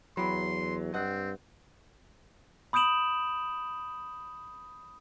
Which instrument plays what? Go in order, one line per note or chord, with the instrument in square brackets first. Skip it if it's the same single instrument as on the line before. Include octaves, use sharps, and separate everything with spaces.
[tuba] E2 [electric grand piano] F#3 [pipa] E4 G4 [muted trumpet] C6
[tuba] G2 [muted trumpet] C4 [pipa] D#5 F#5
[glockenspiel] B5 D#6 G6 D7 E7 F#7